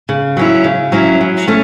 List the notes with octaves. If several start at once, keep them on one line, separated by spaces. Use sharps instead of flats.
C#3
F#3 C#4 E4
C#3
F#3 C#4 E4
F#3
A3 C#4